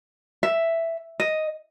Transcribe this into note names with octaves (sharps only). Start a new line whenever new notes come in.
E5
D#5